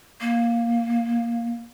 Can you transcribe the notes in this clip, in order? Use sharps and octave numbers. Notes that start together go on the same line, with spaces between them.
A#3